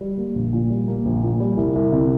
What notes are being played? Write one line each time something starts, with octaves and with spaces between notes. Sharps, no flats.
G3
A#3
A#1
A#2
G3
A#3
A#1
A#2
G3
C2
C2
C3